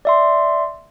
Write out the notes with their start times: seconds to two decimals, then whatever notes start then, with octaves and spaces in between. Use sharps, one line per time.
0.05 D5 E5 C6